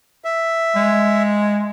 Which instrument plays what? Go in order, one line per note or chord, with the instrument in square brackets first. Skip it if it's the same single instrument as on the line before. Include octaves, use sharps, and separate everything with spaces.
[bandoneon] E5
[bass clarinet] G#3